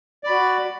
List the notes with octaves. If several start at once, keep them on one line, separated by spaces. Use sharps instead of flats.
F#4 D5 B5